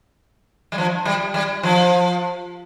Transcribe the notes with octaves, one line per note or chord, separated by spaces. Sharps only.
G3
F3
G3
G3
F3